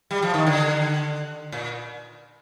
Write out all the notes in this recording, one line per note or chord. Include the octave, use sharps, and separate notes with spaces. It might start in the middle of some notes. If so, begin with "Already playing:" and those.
G3
F3
D#3
D3
A#2